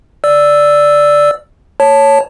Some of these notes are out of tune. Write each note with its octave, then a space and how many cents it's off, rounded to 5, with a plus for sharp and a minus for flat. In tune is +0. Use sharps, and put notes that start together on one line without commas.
D5 +0 E6 +0
C#5 +0 A5 +0